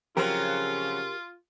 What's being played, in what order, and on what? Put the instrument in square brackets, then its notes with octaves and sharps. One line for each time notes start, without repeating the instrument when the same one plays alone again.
[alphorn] C#3 [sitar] F3 F#3 C4 [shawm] F4 [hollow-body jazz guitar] G4 A#4